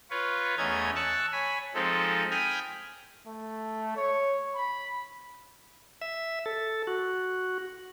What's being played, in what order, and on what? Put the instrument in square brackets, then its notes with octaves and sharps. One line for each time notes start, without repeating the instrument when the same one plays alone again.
[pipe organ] F4 B4 C#5
E2 A3 C#4 D#5 A#5 G#6
A5 C#6 E6 F#6
C#5 G#5 B5
F3 G#3 C4 D#4 A4
G5 G#5 B5 D#6 F6 G6
[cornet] A3
C#5
B5
[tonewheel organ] E5
A4
F#4